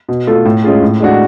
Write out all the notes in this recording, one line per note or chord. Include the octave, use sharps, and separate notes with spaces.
B2
A3 F4 A4
A2
G#3 C#4 F4 G#4
A2
G#3 D4 F#4